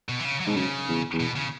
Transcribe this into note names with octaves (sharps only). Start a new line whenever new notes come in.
B2
E3
C#3
F#3
G#2 B2
F#2 C#3
E2
E2
B2
C#3